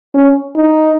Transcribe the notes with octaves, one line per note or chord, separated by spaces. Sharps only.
C#4
D#4